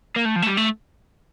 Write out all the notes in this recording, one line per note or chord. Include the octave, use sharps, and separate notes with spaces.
A#3
A3
F3
A3
G3
A3